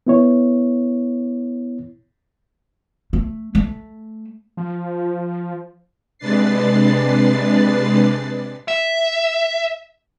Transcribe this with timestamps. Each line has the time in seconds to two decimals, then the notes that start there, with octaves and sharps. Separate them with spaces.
0.07 B3 E4 C#5
3.13 A3
3.55 A3
4.57 F3
6.18 C3 G#3 D4 B4 A6 C7
8.68 E5